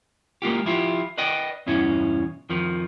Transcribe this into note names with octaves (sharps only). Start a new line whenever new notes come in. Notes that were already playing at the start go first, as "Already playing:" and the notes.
G#3 A#3 F4 G4
F3 E4 F4 G4
B4 D5 D#5 G5
E2 G2 B2 C#4 E4
F2 D#3 F3